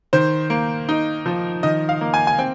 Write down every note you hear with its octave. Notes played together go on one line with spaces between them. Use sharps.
D#3 C5
A#3
D#4
F3
D#3 D#5
F5
A#3
G#5
G#5
C4 G5